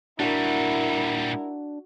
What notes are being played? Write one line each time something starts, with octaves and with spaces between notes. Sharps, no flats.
A#2 G3 D4 E4 F#4 A#4 F#5